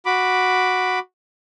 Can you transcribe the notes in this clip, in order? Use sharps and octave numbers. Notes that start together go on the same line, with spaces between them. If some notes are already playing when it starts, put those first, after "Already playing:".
F#4 B5 D6